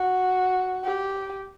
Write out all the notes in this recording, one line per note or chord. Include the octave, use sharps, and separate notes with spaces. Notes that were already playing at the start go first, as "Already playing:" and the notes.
Already playing: F#4
G4